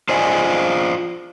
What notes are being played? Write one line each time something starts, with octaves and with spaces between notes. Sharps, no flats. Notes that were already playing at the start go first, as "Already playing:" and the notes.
F4 C5 D5 D#5 G#5